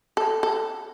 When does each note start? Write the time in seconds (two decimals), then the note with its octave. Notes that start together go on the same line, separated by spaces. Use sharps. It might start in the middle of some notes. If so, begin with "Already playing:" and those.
0.17 A4
0.43 A4